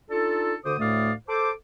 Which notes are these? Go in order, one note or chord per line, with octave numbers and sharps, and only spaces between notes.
D4 D#4 F4 A4
D2 D3 C5 D6 D#6
D2 A2 A3 D5 F5 D#6
A4 C5 D6